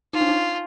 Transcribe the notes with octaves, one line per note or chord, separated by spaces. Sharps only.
D#4 F4
D4
D#4